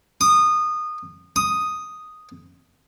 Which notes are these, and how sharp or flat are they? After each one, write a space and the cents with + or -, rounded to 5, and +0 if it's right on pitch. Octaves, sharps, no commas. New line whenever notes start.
D#6 -20
D#6 +0